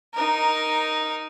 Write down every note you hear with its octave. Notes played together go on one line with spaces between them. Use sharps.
D#4 A#4